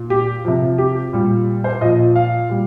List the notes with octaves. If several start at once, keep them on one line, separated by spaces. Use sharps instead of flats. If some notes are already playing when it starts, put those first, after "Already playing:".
Already playing: A#2
G4
C3 F3
G4
A#2 G3
C5
A#2 F3 D#5
F5
A#2 G3